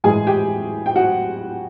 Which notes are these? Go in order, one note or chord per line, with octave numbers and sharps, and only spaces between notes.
A2 E3 G#3 G#4 G#5
G4 G5
G5
F#4 F#5